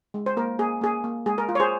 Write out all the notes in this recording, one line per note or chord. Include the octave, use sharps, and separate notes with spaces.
G#3
C5
A#3 A#4
A#3 G#4
A#3 G#4
A#3
G#3 G#4
A#4
F4
C#5
G#4 C5